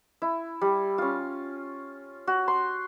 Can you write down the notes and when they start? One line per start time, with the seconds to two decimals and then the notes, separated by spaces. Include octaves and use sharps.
0.22 E4
0.61 G3
0.98 C#4 F4
2.27 F#4
2.48 C6